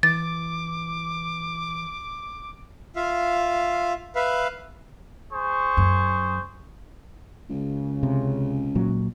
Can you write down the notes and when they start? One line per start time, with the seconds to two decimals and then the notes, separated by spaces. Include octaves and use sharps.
0.03 E3 D6 A6
2.96 F4 E5 F5
4.15 B4 E5 F5
5.31 G#4 C5 C#6
5.77 F#2
7.50 C#2 C#3
8.03 C3
8.75 A#2 F#3